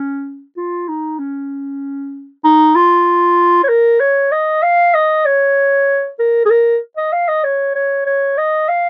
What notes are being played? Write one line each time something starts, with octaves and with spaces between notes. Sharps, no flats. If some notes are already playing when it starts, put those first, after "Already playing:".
Already playing: C#4
F4
D#4
C#4
D#4
F4
C#5
A#4
C#5
D#5
F5
D#5
C#5
A#4
G#4
A#4
D#5
F5
D#5
C#5
C#5
C#5
D#5
F5